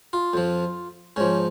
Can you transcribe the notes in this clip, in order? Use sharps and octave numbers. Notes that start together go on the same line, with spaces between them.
F4
F2 F3
G#2 F3 C#4